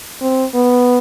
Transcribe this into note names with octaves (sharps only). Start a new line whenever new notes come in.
C4
B3